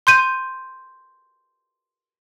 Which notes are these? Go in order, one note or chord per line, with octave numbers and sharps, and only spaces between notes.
C6 G6 D#7